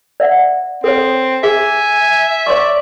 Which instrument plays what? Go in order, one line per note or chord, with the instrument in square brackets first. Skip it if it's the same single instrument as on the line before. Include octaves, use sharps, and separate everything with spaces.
[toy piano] D5 E5 F#5
[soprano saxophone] C4 [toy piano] A4 C#5
[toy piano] G#4 [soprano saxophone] E5 [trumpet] G#5
[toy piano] C#5 C6 C#6 [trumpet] D5